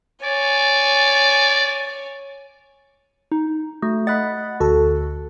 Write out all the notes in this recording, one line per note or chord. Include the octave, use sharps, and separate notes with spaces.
C#5 D5 G#5
D#4
A3 F#4
D#5 F#5 B5 F#6 A6
D2 F#4 A4